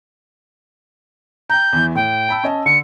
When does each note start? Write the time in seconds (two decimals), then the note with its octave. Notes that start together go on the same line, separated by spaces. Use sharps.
1.50 G5 A#5 G6
1.73 E2 E3
1.95 A2 G5
2.29 A5 B5 E6
2.44 C#4 D#5 A5
2.66 D3 C#7